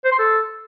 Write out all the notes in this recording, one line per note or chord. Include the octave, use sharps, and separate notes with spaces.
C5
C6
A4